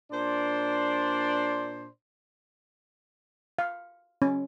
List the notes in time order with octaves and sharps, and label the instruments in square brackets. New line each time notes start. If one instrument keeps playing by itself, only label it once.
[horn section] A#2 D4 C5 D5 C6
[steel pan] F5
C#4